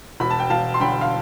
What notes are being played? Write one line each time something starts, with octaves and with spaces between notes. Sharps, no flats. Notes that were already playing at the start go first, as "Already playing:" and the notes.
E1 B5
A5
G5
E1 F5 A5
C6
D3 G5 B5
F5